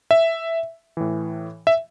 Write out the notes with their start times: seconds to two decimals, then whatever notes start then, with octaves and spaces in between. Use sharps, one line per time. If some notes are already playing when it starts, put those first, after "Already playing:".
0.11 E5
0.97 A2 E3
1.67 E5